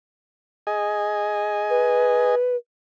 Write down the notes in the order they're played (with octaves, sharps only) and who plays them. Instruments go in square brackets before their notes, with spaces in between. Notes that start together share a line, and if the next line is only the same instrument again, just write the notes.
[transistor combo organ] G#4 D#5 G#5
[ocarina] B4